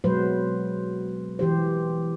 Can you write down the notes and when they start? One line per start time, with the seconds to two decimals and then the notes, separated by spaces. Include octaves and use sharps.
0.04 B2 F#3 G#3 B4 C5
1.39 E3 G4 C5